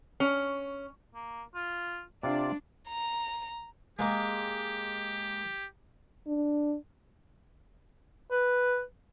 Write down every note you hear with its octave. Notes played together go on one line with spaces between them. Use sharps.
C#4
A#3
F4
C3 D4 F4 D5
A#5
G#3 A#3 G4
D4
B4